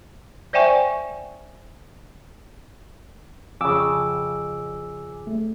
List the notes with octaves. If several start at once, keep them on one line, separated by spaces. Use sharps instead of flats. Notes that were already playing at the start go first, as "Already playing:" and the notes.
C5 D5 E5 G5 G#5 C#6
F2 C#3 G#5 D6 E6
A3